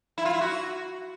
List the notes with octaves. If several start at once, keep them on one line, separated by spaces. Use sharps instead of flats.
E4
F4
E4
F#4